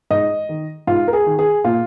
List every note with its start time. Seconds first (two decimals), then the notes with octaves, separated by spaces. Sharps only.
0.10 G#2 D#5
0.49 D#3
0.87 G#2 F4
1.08 A#4
1.13 G#4
1.26 D#3
1.39 G#4
1.64 A#2 F4